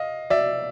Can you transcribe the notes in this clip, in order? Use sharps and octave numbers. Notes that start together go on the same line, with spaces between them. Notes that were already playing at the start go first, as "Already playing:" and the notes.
Already playing: D#5 F5
D5 E5